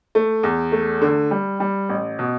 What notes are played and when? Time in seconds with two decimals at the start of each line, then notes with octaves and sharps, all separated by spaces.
0.15 A3
0.43 E2
0.72 A3
1.02 D3
1.31 G3
1.60 G3
1.89 A1
2.19 B2